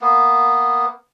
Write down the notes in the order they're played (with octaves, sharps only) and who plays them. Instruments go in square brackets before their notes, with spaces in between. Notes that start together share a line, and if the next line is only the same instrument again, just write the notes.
[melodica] A#3 B3